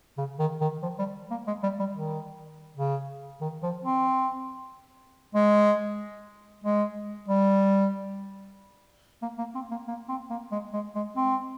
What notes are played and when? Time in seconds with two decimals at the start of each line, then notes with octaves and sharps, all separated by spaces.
0.18 C#3
0.39 D#3
0.61 D#3
0.83 F3
0.99 G3
1.31 A#3
1.47 G#3
1.63 G3
1.79 G3
1.95 D#3
2.76 C#3
3.41 D#3
3.63 F3
3.84 C4
5.35 G#3
6.64 G#3
7.29 G3
9.22 A#3
9.38 A#3
9.55 C4
9.71 A#3
9.88 A#3
10.09 C4
10.30 A#3
10.52 G#3
10.73 G#3
10.95 G#3
11.16 C4